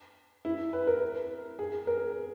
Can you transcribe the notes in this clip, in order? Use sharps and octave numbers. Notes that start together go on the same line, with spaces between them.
E4
B4
A#4
G#4
A#4